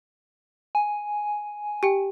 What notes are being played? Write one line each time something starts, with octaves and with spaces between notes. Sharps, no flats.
G#5
G4 G5